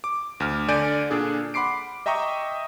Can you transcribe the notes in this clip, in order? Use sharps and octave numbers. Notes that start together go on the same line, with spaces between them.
D6
D2 F6
D3 D5 G#5 G6 D7 D#7
A#2 D4 G#4 A4
F#5 B5 C6 D6 C7 D7
D#5 E5 G5 A#5 C#6 D#6